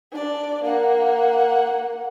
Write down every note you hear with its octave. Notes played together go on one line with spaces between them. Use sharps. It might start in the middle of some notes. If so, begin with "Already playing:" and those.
D4 D5
A#3 F#5